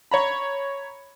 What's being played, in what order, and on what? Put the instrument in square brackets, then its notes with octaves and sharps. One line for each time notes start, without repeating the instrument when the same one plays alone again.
[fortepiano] C#5 A#5 B5